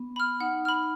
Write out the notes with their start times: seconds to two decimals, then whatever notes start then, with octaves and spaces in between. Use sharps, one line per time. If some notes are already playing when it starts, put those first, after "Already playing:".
Already playing: B3
0.16 B5 F6
0.40 D#4 F#5
0.65 B5 F6